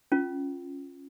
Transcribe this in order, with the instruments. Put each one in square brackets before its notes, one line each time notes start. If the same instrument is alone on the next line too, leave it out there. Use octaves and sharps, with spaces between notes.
[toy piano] C#4 F4